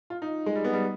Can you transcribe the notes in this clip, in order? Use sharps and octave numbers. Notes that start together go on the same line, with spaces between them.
F4
D#4
G#3
G3
B3
G3